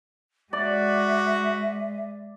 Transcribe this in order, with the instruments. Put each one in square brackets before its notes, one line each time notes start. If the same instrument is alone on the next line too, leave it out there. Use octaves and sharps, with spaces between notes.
[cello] G#3 [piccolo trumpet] F#4 [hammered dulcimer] D5 [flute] E5